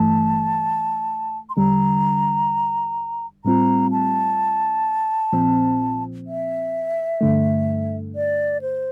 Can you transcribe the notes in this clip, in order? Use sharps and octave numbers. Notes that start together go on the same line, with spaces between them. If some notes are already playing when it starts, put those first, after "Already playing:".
Already playing: G1 G2 E3 A3 A5
C6
E2 D3 G3 A#5
A2 G3 C4 F4 A#5
A5
A#1 A#2 F3 C4
E5
G2 D3 A3
D5
C5